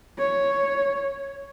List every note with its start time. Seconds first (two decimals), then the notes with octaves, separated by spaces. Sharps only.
0.19 C#5